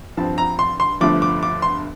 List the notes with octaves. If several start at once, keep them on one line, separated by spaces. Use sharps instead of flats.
G2 F3 C4 A5
A#5
C6
C6
G1 G2 F3 A3 D6
D6
D6
C6